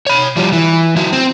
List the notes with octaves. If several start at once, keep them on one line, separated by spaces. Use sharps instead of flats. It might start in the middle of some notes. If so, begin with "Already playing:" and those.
C#5 B5
F3 G3
E3
F#3 E4
C4